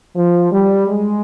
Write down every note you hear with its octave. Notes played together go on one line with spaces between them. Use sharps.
F3
G3
G#3